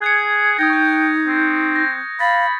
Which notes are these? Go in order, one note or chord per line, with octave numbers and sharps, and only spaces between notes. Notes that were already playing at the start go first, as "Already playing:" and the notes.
G#4 F#6 G#6 C#7
D#4 G5 D#6 G#6 A#6
C#6 G6
C4
G6 A#6
F5 B5 A6